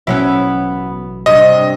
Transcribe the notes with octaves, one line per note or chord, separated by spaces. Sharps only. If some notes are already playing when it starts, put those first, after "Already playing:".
A1 B2 F#3 B3 C#4 E4
G2 C3 D#5